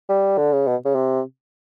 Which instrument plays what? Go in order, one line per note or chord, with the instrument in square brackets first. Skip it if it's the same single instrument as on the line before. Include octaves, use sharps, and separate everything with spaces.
[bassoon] G3
D3
C#3
B2
C#3
C3